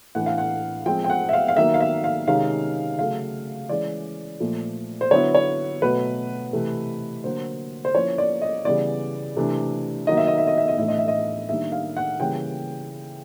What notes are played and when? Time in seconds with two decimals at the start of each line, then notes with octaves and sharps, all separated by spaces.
0.15 A2 E3 A3 D4 F#5
0.26 F5
0.38 F#5
0.86 F3 G#3 C4 G5
1.04 G5
1.10 F#5
1.29 E5
1.33 F5
1.48 F5
1.57 D#3 F#3 A#3 E5
1.74 F5
1.81 E5
2.04 F5
2.28 C3 D#3 G#3 C#4 F5
2.98 C#3 F#3 A3 F5
3.69 E3 G#3 C#4 D5
4.40 A#2 F3 A3
5.01 C5
5.11 D3 F#3 B3 E4 C#5
5.35 C#5
5.82 B2 F#3 A3 B4
6.53 C3 E3 A3
7.24 D3 F#3 A#3 C5
7.85 C5
7.94 F3 A#3 C#4 E4 C#5
8.18 D5
8.42 D#5
8.65 C#3 E3 G3 B3 D5
9.36 C3 E3 A3 D4
10.07 D#3 F#3 A#3 D#4 D#5
10.17 E5
10.27 D#5
10.38 E5
10.47 D#5
10.58 E5
10.68 D#5
10.78 A2 E3 A3 D4 E5
10.88 D#5
10.98 E5
11.08 D#5
11.49 D#3 G3 A#3 D4 E5
11.72 F5
11.97 F#5
12.20 C#3 E3 G3 A#3 C#4 G5